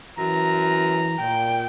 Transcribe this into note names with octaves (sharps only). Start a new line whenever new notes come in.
F#2 E3 A#5
A#2 G5